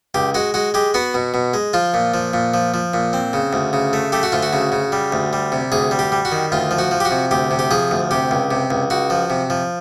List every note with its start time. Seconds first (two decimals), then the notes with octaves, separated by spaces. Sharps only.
0.14 C#2 G4
0.34 G#3 F#4
0.54 G#3 F#4
0.74 G#3 G4
0.94 B3 F#4
1.14 B2
1.34 B2
1.54 G#3
1.73 F3 F4
1.94 A#2
2.14 F3
2.33 A#2
2.54 F3
2.74 F3
2.94 A#2
3.13 C4
3.33 C#3
3.53 D2
3.73 C#3
3.93 A3
4.12 A3 G4
4.23 F#4
4.32 D2 F4
4.43 F#4
4.53 C#3
4.72 C#3
4.92 G3
5.12 D2
5.33 G3
5.52 C3
5.72 D2 G#4
5.91 G3
5.99 G4
6.12 G3
6.25 F#4
6.32 D#3
6.52 D2 F4
6.71 F3
6.79 F#4
6.91 F3
7.00 G4
7.05 F#4
7.11 C3
7.31 D2 G4
7.51 C3
7.59 G4
7.71 F3 G#4
7.91 D2
8.11 C3 G4
8.31 C#2
8.51 C3
8.70 C#2
8.90 C#2 F#4
9.10 F3
9.30 C3
9.50 F3